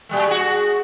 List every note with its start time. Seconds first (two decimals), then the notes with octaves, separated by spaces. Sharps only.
0.09 A#2 G3 A3
0.28 F#4 G#4